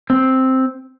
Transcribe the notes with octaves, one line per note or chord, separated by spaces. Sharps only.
C4